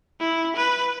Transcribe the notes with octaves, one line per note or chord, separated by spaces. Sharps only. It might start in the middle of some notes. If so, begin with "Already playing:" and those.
E4
B4